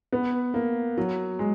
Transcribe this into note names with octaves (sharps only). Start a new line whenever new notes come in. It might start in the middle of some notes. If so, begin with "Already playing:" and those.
B3
A#3
F#3
G#3